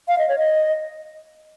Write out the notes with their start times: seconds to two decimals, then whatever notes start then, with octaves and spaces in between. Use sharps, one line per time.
0.08 F5
0.18 D#5
0.29 C#5
0.38 D#5